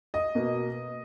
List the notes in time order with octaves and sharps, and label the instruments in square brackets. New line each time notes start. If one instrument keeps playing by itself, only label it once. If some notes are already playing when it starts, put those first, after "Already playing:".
[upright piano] D#5
B2 A#3